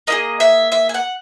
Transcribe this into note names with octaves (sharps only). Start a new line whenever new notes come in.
A#3 E4 G#4 D#5
E5
E5
G#5
F#5